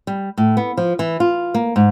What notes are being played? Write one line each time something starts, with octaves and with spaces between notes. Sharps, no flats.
G3
A2
B3
F3
E3
F4
A#3
G#2